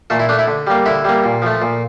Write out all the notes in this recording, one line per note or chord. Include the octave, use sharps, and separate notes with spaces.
A#2 A3 A4
E4
A3 D4
E4
D3
G3 A#3
D3 E4
G3 A#3
A#2
F3 A3
A#2